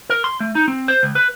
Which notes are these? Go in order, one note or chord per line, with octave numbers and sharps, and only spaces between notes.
A#4
C6
A3
D#4
C4
C5
C#2
B4